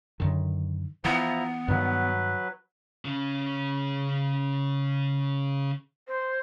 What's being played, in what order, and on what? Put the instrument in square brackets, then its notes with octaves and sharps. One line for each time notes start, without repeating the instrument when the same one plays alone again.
[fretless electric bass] F#2 D3 D#3
[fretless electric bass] E3 [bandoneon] F3 E4 A#5 [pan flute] B3
[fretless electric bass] G2 D#3 [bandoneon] F#3 B4
[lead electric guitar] C#3 C#4
[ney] C5